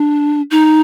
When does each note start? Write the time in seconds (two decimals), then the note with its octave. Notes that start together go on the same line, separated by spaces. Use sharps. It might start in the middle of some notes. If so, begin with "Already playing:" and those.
Already playing: D4
0.51 D#4